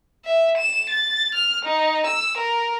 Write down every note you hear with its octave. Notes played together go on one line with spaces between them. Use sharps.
E5
E7
A6
F6
D#4
E6
A#4